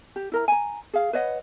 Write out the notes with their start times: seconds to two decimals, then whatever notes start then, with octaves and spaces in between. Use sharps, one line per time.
0.16 G4
0.32 E4 A#4 A#5
0.48 G#5 A#5
0.94 G#4 F5
1.13 B4 C#5 D#5 F#5